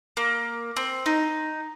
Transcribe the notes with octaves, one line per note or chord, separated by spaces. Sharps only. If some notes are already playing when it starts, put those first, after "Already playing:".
A#3
C4
D#4